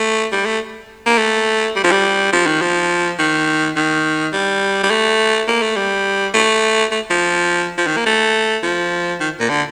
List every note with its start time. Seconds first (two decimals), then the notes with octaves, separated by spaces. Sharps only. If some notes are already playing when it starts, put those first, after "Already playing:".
Already playing: A3
0.32 G3
0.46 A3
1.06 A#3
1.18 A3
1.76 G3
1.84 F3
1.91 G3
2.32 F3
2.47 D#3
2.62 F3
3.19 D#3
3.76 D#3
4.33 G3
4.83 G3
4.91 A3
5.48 A#3
5.62 A3
5.76 G3
6.34 A3
6.92 A3
7.10 F3
7.78 F3
7.87 D#3
7.97 A#3
8.06 A3
8.63 F3
9.20 D#3
9.40 A#2
9.49 D3